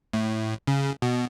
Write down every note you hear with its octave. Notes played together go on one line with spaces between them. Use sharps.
A2
C#3
B2